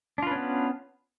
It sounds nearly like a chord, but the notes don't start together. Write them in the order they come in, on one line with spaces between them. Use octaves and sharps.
D4 F4 B4 C#4 B3